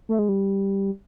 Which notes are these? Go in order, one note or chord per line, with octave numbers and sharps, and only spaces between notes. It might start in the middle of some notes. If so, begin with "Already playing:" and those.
A3
G#3
G3